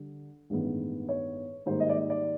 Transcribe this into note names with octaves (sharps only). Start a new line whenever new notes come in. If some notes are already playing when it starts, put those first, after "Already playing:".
Already playing: D3 G3
A1 G2 D#3 G#3 B3
C#5
G#2 D#3 G3 A#3 C5
D#5
D5
D#5
D5